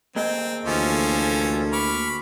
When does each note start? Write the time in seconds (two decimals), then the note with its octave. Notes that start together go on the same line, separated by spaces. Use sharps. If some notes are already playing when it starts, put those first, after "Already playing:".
0.16 A#3 C4 G#4 D#5
0.65 D2 E3 F3 C#4 F4 A4
1.73 B5 C#6 D6 F6